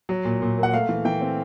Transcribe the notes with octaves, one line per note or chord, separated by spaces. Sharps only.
F#3
A#2
A#2
A#3
F#5
A3 F5
E3
E3 G5
C4